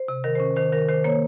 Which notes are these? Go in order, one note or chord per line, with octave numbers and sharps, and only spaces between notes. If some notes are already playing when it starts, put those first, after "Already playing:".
Already playing: C5
C3
D#3 A#4
C#4 C5
D#3 C5
D#3 A#4
D#3 C5
A#3 C#5